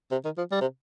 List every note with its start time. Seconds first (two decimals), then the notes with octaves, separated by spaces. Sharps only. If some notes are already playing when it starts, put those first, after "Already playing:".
0.12 C3
0.25 D#3
0.38 F3
0.51 G3
0.61 C3